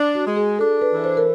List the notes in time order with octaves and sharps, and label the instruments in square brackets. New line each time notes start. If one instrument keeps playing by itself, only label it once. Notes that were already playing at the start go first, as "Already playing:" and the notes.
Already playing: [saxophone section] D4
[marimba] F#4
[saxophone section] G#3
[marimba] G#4
[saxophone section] D4 [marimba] A4
[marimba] B4
[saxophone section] E3
[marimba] C5
A#4